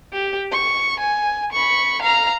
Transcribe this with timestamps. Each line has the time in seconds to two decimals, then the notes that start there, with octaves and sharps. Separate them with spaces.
0.13 G4
0.52 C#6
1.00 G#5
1.52 B5 C#6
2.02 F5 A#5